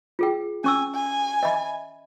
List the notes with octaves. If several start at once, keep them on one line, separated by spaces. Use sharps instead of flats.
F4 G#4 G5
C#4 G#5 C#6 E6
G#5
D#5 E5 B5